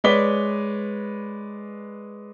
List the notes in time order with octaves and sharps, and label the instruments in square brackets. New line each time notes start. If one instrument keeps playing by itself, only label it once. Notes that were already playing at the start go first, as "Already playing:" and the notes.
[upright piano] G#3 B4 C#5 D5 B6 G7